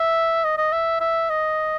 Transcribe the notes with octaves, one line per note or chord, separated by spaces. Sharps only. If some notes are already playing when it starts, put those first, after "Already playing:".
Already playing: E5
D#5
D#5
E5
E5
D#5